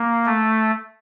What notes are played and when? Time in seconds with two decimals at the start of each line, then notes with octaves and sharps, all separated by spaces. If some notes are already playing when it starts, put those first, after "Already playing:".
Already playing: A#3
0.26 A3